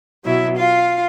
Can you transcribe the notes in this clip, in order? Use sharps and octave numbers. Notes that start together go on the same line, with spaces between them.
B2 F#3 E4 E5
F4 F5